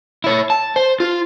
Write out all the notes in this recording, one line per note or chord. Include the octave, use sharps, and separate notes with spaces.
E4 C#5
A5
C5
F4